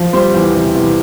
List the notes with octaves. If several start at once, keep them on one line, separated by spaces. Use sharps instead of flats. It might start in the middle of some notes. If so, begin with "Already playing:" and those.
Already playing: F3
G3 C5
E2
C3
E2